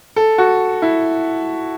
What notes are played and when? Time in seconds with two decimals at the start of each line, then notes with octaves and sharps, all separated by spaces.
0.16 A4
0.38 F#4
0.82 E4